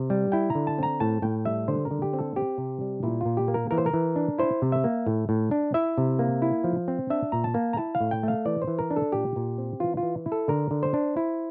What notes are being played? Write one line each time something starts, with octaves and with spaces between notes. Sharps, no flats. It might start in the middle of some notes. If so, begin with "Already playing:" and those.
Already playing: C3
G3
E4 G5
A#5
D3
A5
C4 A#5
A2 A5
A2 G5
G3 E5
D3 C5
A#4
D3
G4
C4
A4
C4 G4
C3
G3
A#2 E4
A#2 F4
G4
A#3
A#4
E3 A#4
C5
A#4
E3
D4
E4 C5
C3
E5
A#3
A2
A2
D4
E4 E5
C3
A#3
E4
F3
C4
D4 E5
A#2 A#5
A5
A#3
A#5
E4 A5
F5
A2
G5
A3 F5
E3 D5
C5
E3
A#4
D4
A4
A#2 G4
A#2
C4
E3 F4
F4
E3
E4
A4
D3 A#4
D3
C5
D4
E4